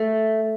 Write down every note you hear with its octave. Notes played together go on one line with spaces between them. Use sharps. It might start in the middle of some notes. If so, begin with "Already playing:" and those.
Already playing: A3